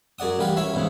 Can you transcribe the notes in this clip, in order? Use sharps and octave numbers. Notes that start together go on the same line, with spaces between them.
F#2 G#4 D5 F#5 D#6
A1 G3 B4 F5 F#5
C#4 E4 B4 C#5 B5
E2 G#2 C#3